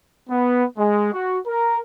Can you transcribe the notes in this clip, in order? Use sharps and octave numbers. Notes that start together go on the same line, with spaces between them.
B3
G#3
F#4
A#4